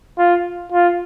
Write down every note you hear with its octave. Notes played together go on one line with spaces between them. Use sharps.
F4
F4